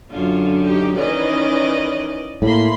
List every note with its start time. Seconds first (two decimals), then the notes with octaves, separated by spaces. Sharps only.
0.10 F#2 D3 F4
0.62 D#4 G4
0.96 D#3 E3 C#4 D5 D#5
2.42 A2 A#3 B5 C6